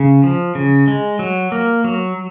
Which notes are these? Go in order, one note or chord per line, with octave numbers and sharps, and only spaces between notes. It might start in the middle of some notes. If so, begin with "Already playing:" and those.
Already playing: C#3
F3
C#3
G#3
F#3
A#3
F#3